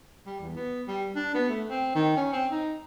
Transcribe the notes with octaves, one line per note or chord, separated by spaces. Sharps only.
G3
E2
B3
G3
D4
B3
A3
C4
D#3
C#4
C4
D#4